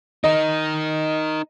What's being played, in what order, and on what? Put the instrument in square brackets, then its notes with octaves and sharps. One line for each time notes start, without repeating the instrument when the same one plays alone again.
[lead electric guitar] D#4 A#4 [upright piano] D#5